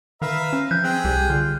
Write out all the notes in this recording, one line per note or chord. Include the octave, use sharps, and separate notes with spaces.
D#3 B4 E5 F5 A#5
C#4
F3 F#6 G6
C4 G#4 G5
C2 G3
D3 F4